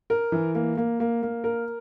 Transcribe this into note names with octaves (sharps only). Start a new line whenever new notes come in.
A#4
E3
A#3
A#3
A#3
A#3
A#4